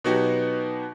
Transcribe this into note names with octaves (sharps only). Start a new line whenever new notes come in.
B2 F#3 B3 D#4 F#4 G4